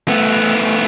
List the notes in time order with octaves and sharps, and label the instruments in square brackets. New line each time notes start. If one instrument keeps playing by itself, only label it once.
[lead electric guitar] A3 B3